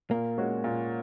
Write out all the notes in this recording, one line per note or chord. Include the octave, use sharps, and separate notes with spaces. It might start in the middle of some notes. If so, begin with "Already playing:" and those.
A#2 A#3
G#3 C#4 F#4
A#2